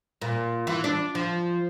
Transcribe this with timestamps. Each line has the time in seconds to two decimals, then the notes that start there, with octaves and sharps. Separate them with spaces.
0.21 A#2
0.67 E3
0.84 D4
1.15 F3